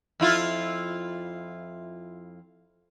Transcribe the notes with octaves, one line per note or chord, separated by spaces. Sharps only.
F2 E4 F4